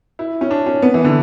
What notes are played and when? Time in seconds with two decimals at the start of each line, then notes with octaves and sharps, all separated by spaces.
0.19 E4
0.41 C#4
0.51 D4
0.66 C#4
0.82 B3
0.94 E3
1.05 D3